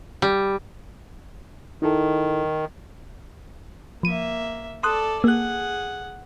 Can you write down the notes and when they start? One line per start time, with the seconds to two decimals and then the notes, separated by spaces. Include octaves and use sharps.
0.22 G3
1.82 D#3 D#4 E4 A4
4.03 F3 A#3 E5 D#7
4.83 A4 D5 C6 D#6 F#6
5.24 A#3 G#4 F#5 F#6